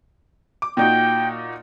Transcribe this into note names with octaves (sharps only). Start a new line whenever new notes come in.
D6
A#2 D#4 F#4 G5